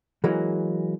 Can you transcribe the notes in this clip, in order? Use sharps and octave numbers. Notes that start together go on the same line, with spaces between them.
E3 F#3 G#3 A#3